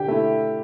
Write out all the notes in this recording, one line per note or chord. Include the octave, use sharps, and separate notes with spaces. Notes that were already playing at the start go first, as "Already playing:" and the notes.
Already playing: D3 G4 G5
A3 E4